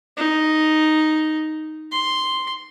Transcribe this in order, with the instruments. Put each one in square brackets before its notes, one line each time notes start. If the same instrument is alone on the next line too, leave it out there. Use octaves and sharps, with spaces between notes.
[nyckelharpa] D#4
C6